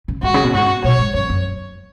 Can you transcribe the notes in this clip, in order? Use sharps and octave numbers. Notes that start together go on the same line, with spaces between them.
C#3
G#2 F#4
C#3
B2
G#2 F#4
B2 C#5
G#2
F#2 C#5
F#2